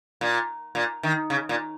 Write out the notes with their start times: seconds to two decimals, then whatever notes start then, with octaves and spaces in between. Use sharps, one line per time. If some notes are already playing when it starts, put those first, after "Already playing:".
0.21 A#2
0.75 A#2
1.03 D#3
1.30 C#3
1.49 A#2